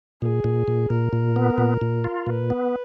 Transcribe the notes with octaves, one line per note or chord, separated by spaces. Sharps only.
A#2 G#4
A#2
A#2
A#2 A#4
A#2
B3
A#2
A#2
F4
A#2 B4
B3